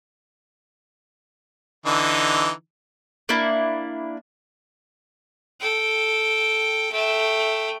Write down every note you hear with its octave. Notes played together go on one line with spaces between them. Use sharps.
D3 E3 D#4
A#3 D4 E4
A4 G5
A3 G5